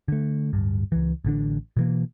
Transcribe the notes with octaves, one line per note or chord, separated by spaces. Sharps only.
D3 A3
D1 A#1 G2
C#2 E3
A1 D3 D4
B2 E3 A#3